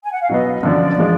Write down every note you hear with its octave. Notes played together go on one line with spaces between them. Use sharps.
G#5
F#5
F5
B2 F#3 B3 D#5
F#2 D3 F3 D5
F3 G#3